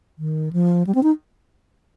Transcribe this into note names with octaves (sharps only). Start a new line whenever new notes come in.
D#3
F3
G3
C4
D#4